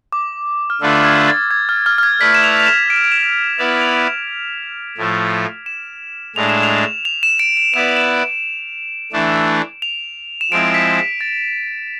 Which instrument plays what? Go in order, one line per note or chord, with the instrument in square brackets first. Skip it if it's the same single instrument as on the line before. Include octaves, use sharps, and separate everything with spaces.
[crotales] D6
F6
[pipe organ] D3 A3 D4 F4 B4 [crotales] E6
[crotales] G#6
A6
G#6
F6
F6
F6
G#6
[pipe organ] A3 E4 B4 D5 [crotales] B6
[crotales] E7
F7
F7
E7
D7
E7
D7
E7
D7
[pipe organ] B3 E4 B4 D5 [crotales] F7
[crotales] F7
[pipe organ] A2 F3 A3
[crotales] E7
[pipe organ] A2 G#3 D4 [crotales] F7
[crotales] E7
F7
F7
E7
D7
D7
[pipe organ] B3 E4 B4 D5 [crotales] E7
[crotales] F7
E7
D7
[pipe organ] E3 A3 D4
[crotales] F7
E7
[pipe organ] F3 G#3 C4 E4 [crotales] D7
[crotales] B6
B6
A6